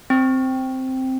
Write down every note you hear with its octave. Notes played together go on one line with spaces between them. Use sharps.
C4